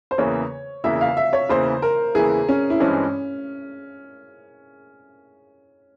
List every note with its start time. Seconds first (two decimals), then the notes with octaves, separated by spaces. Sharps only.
0.11 C5
0.18 E2 C#3 E3 A#3 E4 C#5
0.84 E2 C#3 E3 A#3 E4 E5
1.01 F5
1.17 E5
1.33 C#5
1.49 E2 C#3 E3 A#3 E4 C5
1.82 A#4
2.15 E2 C#3 E3 A#3 E4 G#4
2.49 C#4
2.70 E4
2.80 G2 E3 G#3 C4 C#4